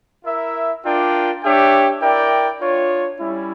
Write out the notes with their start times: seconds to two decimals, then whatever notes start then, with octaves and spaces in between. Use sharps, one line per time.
0.24 E4 A#4 E5
0.83 D4 F4 A#4 D5 G5
1.43 D4 G4 C#5 E5 G5
2.01 E4 A#4 D5 G5
2.60 D4 F4 C#5
3.19 G3 C#4 E4